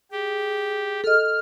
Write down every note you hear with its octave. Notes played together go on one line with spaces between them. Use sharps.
G4 G#4
A4 D#5 F6